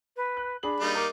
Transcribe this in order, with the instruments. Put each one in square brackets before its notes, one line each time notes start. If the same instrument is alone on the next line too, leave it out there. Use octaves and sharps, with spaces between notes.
[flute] B4
[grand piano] F#6
[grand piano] D4 G#4 F#7 [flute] B5
[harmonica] G3 A#3 D#4
[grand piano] A#4 F6 [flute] D6